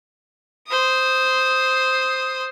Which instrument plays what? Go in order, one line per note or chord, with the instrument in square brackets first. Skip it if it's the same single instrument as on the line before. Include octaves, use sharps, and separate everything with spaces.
[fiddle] C5 D#6